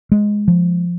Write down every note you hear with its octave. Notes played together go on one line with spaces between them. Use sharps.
G#3
F3